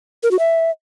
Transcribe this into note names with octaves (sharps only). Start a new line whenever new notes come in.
A#4
F#4
E5